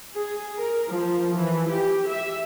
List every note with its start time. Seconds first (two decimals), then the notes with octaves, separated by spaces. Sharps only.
0.15 G#4
0.58 A#4
0.91 F3
1.34 E3
1.70 G4
2.09 E5